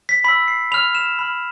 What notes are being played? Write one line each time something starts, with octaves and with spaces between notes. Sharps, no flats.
B6
B5 E6 B6
C7
B5 F6 F7
E7
B5 F6